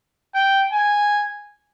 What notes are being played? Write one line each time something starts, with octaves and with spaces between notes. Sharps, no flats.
G5
G#5